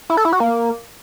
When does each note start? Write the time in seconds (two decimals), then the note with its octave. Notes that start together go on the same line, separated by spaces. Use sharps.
0.10 E4
0.17 A4
0.25 E4
0.33 F#4
0.40 A#3